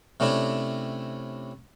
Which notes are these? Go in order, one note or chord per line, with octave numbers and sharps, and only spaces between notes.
C3 A3 C#4 D4 E4